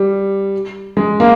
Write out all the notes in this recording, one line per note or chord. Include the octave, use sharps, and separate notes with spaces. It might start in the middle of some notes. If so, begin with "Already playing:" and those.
Already playing: G3
G#3
A#3